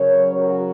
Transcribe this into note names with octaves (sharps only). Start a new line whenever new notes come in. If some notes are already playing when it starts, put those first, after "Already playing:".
Already playing: C#3 F#3 C#4 A#4 C#5
F#4 A#4